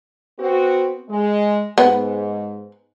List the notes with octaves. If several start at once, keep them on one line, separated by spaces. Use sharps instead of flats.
B3 C4 F#4
G#3
G#2 B3